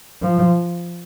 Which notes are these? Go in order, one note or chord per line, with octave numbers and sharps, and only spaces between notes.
F3